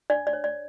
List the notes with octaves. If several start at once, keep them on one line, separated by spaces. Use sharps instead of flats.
D4 D5
D5
C#5
D5